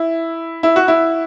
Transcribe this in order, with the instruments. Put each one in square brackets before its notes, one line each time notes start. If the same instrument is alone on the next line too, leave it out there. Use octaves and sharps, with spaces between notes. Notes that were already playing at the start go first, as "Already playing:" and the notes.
Already playing: [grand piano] E4
E4
F#4
E4